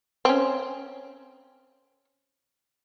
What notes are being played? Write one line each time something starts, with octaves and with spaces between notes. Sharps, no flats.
C4 C#4